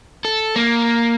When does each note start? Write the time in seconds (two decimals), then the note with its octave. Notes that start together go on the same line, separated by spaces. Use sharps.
0.25 A4
0.56 A#3